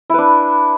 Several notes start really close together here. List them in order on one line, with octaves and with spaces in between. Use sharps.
E4 B4 D4